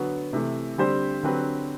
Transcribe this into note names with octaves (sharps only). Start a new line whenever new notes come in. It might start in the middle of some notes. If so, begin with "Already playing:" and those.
Already playing: D3 F#3 B3 F#4
C3 E3 A3
D3 G3 C4 G4 C5
D3 F#3 C4 G4 B4